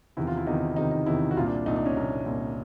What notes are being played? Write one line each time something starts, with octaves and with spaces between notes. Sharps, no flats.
E2 C3 D#3 E4
F4
E4
E2 C3 D#3 D#4
E2 C3 D#3 D#4
D#4
E2 C3 D#3 E4
F#4
C2 A#2 F4
D4
C2 A#2 D#4
D4
C#4
C2 A#2
C2 A#2